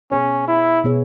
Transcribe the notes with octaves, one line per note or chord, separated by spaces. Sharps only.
B2 B3 C#4 G#4 C#5
E4
B2 B3 G#4 C#5